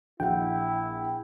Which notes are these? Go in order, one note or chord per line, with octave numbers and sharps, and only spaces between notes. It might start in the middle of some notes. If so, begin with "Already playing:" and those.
A#1 E4 F#5 G5